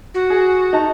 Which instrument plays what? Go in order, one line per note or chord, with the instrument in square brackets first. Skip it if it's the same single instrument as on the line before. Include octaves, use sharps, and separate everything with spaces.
[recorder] F#4
[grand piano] G#4
D#4 A5